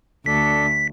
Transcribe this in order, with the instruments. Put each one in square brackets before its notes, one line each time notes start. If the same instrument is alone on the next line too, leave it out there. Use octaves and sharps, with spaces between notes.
[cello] D2 [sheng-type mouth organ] D4 A4 [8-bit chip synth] B6